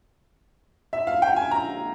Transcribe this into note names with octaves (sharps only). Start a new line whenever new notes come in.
E5
F5
G5
G#5
A#5